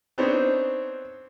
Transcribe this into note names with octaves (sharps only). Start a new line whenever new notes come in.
B3 C4 D4 D#4 C5 C#5